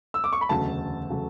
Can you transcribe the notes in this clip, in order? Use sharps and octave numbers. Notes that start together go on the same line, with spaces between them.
E6
D6
C#6
B5
E1 D2 C#3 F#3 A3 A5
C#3 F#3 A3